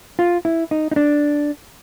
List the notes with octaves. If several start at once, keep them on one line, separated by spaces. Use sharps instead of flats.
F4
E4
D#4
D#4
D4